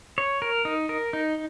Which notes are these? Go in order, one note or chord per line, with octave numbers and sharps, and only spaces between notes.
C#5
A#4
D#4
A#4
D#4